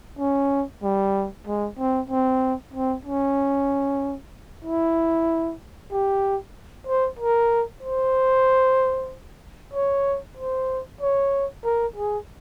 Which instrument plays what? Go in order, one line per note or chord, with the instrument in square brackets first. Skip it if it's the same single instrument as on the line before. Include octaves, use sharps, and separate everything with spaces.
[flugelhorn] C#4
G3
G#3
C4
C4
C4
C#4
E4
G4
C5
A#4
C5
C#5
C5
C#5
A#4
G#4